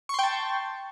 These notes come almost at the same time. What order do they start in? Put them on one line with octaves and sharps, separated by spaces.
C#6 C6 G5 A5